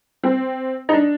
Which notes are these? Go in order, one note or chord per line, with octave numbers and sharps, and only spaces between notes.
C4
D#4
D4